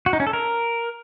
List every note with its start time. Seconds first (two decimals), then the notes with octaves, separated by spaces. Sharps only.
0.06 F#4
0.13 D#4
0.20 C#4
0.27 A4
0.33 A#4